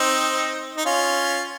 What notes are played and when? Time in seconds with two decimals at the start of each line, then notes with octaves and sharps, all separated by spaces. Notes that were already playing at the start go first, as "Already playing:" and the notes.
Already playing: C4 D#4
0.77 D#4
0.86 C#4 F4